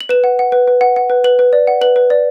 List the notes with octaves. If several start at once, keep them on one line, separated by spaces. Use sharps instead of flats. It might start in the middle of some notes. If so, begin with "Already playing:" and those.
F#7
B4 E7
F#5
F#5
B4
B4
F#5
F#5
B4
B4 F#7
B4
D5
F#5
B4 F#7
B4
D5